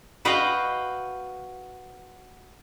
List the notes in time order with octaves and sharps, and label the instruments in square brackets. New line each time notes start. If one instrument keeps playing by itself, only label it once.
[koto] F#4 B4 D#5 F5 G5